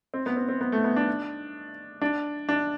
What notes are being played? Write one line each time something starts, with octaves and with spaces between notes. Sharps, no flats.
C4
B3
C4
C4
B3
A3
B3
D4
D4
D4